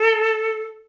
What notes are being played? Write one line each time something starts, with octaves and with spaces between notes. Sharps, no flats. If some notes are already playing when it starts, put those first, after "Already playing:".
Already playing: A4